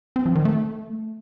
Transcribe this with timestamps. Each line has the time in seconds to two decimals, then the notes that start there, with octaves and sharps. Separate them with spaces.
0.16 C4
0.26 F3
0.35 D#3
0.45 A3